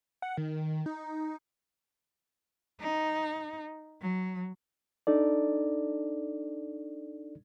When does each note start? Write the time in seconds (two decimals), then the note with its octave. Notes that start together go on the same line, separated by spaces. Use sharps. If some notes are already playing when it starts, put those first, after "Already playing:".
0.22 F#5
0.37 D#3
0.86 D#4
2.80 D#4
4.01 F#3
5.07 D4 D#4 A4 D5